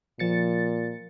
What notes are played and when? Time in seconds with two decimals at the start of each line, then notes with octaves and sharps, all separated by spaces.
0.19 A#2 F3 A6 C#7